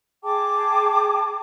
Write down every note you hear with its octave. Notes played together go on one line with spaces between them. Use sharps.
G#4 G5 A5 D6